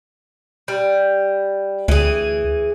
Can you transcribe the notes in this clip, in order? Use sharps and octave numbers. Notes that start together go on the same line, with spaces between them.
G3
D2 E3 G#4